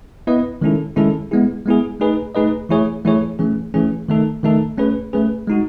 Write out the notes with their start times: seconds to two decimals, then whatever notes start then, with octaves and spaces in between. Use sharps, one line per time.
0.27 B3 E4 B4 D#5
0.61 D#3 G#3 C#4 E4 A4
0.96 D#3 G#3 C#4 E4 A4
1.31 G#3 B3 E4 G#4
1.66 G#3 B3 E4 G#4
2.00 A3 D#4 G#4 B4 D#5
2.35 A3 D#4 G#4 B4 D#5
2.69 E3 A3 E4 G#4 C#5
3.05 E3 A3 E4 G#4 C#5
3.39 E3 A3 C#4 G#4
3.74 E3 A3 C#4 G#4
4.08 D#3 A3 D#4 A4
4.43 D#3 A3 D#4 A4
4.78 A3 C#4 G#4 B4
5.13 A3 C#4 G#4 B4
5.47 G#3 D#4 F#4